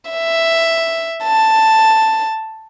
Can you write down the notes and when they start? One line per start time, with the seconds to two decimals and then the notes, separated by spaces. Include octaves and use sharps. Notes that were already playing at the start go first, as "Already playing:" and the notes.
0.11 E5
1.24 A5